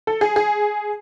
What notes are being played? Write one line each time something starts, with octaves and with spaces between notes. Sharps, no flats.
A4
G#4
G#4